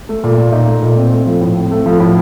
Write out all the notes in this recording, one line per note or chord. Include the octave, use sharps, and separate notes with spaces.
A3
A#2
A#2
D#4
A3
A#2
C4
A3
F3
A2
C4
A3
F3
A2